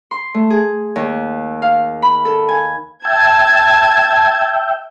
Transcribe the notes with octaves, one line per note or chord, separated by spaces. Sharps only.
C6
A3
G#4
D#2
F5
B5
A4
G#5
E5 G5 A5 G#6